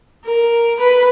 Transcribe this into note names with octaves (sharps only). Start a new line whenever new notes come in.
A#4
B4